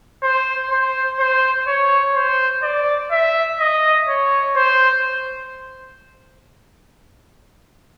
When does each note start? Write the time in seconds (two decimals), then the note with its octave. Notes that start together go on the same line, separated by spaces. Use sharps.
0.23 C5
0.71 C5
1.19 C5
1.67 C#5
2.15 C5
2.63 D5
3.12 E5
3.60 D#5
4.08 C#5
4.56 C5